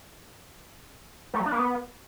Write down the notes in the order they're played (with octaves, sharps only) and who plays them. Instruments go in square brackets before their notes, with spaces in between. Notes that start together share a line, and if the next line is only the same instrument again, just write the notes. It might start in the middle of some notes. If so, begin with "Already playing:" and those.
[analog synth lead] A3
F#3
D4
A#3
B3